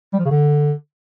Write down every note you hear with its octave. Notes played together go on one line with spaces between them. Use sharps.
G3
F3
C#3
D3